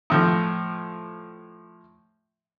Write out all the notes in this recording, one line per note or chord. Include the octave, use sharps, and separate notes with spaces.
A2 F3